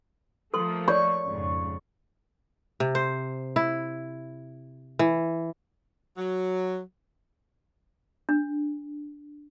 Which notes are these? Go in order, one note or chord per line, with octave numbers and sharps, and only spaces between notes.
F3 A3 A#3 A4 C6
C#5 D5 C#6
F2 G#2 C#3
C3
C5
E4
E3
F#3
D4